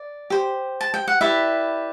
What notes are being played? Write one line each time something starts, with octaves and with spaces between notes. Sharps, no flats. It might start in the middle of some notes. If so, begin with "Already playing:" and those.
Already playing: D5
G4 C5
A5
G5
F#5
E4 G4 B4 D5 E5